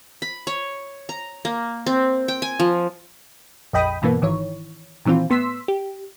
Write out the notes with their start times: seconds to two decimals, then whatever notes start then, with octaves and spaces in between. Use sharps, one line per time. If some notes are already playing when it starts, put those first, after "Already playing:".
0.22 B5
0.47 C#5
1.09 A#5
1.45 A#3
1.86 C4
2.28 G5
2.42 G#5
2.60 F3
3.73 A#1 F2 D#5 G5 B5 D#6
4.02 G2 B2 E3 A#3 B3
4.22 G#1 D#3 E3 C#5
5.05 A#2 D#3 E3 C4 F4
5.30 A2 B3 C6 E6 B6
5.68 G4